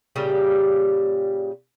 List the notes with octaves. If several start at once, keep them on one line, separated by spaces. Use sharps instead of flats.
A#2 C#3 G3 G4